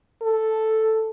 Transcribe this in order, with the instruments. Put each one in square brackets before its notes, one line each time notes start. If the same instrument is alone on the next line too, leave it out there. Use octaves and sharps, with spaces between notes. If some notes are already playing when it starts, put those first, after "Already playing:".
[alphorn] A4